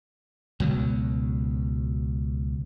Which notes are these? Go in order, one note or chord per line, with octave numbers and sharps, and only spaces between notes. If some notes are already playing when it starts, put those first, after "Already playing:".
C#2 B2 F#3